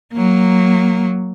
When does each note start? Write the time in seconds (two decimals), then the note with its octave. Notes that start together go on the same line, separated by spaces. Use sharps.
0.13 F#3 A#3